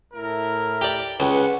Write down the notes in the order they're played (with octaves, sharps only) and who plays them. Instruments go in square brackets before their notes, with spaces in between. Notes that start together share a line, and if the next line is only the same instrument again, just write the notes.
[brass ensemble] A2 E4 A#4
[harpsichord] G4 D5
[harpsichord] C#2 [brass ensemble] B4 F#5